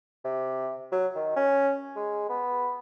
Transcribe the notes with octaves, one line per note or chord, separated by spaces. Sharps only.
C3
F#3
D#3
C#4
G#3
B3